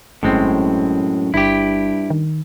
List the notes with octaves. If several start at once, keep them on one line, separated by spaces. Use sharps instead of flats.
G1 F#2 A2 G#3 C4
G1 G2 E4 G4
D#3